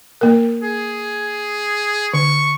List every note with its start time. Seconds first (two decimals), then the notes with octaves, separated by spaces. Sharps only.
0.21 A#3 A#4
0.63 G#4
2.13 D3 C#6